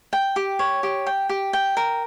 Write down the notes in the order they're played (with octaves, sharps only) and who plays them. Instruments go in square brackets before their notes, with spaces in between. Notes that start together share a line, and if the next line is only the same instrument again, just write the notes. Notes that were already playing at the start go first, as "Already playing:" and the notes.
[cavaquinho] G5
G4
C#5
G4
G5
G4
G5
A#4